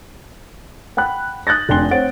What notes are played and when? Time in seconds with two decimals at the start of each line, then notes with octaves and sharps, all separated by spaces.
0.97 F#5 G5 B5 F#6
1.47 D#6 F#6 G6 A6 A#6
1.69 F1 D4 G5 G#5 C6 G7
1.91 C4 C#5 F#5 A6 D7